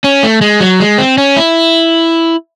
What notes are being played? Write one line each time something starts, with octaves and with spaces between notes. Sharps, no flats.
C#4
A3
G#3
F#3
G#3
C4
C#4
E4